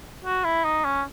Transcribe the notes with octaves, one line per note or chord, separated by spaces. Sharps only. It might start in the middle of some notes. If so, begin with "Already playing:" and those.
F#4
E4
D#4
C#4